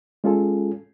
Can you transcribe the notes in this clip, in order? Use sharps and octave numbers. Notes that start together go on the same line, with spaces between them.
G#3 C#4 F4 G#4 A4